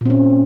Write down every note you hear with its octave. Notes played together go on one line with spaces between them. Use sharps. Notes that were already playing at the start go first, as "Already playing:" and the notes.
A#2 C4 C#4